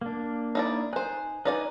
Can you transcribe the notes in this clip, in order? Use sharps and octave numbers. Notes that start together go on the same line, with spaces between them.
A#3 D4
D#4 E4 D5
D#4 C5 G#5 F#6
D#4 B4 D5 G#5